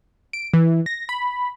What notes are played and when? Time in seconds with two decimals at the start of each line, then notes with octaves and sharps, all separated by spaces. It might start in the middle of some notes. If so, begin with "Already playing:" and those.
0.33 D7
0.54 E3
0.86 A#6
1.09 B5